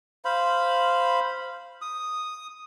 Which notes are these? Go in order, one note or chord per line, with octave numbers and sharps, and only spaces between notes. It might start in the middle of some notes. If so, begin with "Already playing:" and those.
C5 F5 B5
D#6